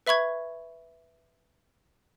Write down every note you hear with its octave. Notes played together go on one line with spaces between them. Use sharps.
B4 E5 B5 C#6 G#6